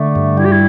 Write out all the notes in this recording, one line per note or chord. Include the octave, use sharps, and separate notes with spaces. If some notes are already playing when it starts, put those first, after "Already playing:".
Already playing: D3 A3
G2
G3 E4
G4
E4